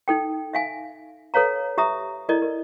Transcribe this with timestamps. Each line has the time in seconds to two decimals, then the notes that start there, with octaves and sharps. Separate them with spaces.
0.08 D#4 A4 G5
0.53 E5 F5 G#5
1.34 A4 B4 C#5 F5 A#5
1.78 G4 E5 A#5 D#6
2.29 E4 A4 A#4 D5 D#5
2.42 A#4